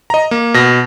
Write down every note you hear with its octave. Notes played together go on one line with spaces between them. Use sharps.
D#5 A#5
A#3
B2 A#6